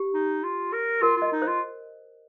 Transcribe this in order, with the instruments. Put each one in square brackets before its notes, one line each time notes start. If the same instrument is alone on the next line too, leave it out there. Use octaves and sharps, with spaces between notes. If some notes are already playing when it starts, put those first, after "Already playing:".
Already playing: [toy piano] G4
[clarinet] D#4
F4
A#4
[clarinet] F4 [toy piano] A#4
[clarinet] F4 [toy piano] D#5
[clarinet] D#4
[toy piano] C5
[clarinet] F4